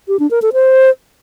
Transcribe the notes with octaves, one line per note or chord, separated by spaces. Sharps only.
G4
D4
A#4
A4
C5